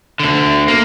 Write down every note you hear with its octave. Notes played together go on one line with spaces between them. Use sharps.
D2 D3
A#3